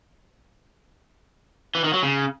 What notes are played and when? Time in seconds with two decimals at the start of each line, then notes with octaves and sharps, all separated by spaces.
1.75 E3
1.84 D#3
1.93 F#3
2.03 C#3